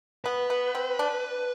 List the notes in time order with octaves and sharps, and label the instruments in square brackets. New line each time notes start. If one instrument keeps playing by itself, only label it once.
[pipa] B3 [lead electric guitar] B4
[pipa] B3
C4
D4